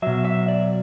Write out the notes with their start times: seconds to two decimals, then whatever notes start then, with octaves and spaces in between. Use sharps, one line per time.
0.02 B2 F#3 E5
0.25 E5
0.48 D5